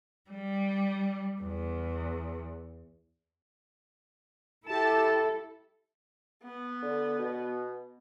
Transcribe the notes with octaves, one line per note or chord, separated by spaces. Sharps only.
G3
E2
E4 G4 A4 A5
B3
D3
B2